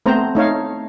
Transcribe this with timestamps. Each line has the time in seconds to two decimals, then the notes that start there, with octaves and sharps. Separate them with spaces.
0.06 A3 B3 C4 C5 A#5
0.35 A3 D#4 C#5 F5